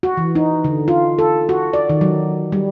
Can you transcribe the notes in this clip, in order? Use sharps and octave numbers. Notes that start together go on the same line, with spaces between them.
F#4
E3
D#4
D3
F4
A4
F#4
D5
D#3
F#3
G3